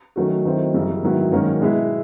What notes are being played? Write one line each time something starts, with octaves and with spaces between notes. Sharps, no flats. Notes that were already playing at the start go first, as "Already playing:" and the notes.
D#3 F#3 A3 C#4 F#4
D#3 F#3 A3 C4 E4
F#2 C#3 E3 G3
G#2 D#3 F#3 B3 E4
G#2 D#3 F#3 A#3 C#4
B2 G#3 B3 E4